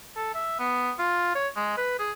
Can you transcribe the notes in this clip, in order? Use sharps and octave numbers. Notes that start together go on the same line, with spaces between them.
A4
E5
B3
F4
C#5
G#3
B4
G#4